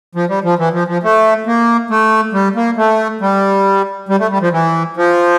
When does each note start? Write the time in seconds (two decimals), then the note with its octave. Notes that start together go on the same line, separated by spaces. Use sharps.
0.15 F3
0.29 G3
0.44 F3
0.59 E3
0.73 F3
0.88 F3
1.03 A3
1.46 A#3
1.90 A3
2.33 G3
2.56 A#3
2.77 A3
3.21 G3
4.09 G3
4.20 A3
4.31 G3
4.41 F3
4.52 E3
4.97 F3